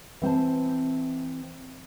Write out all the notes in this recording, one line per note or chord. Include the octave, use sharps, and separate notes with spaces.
E3 C4 C5 A5